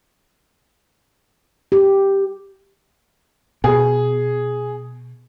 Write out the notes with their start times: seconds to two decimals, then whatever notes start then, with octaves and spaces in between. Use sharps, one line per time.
1.72 G4
3.64 B2 G#4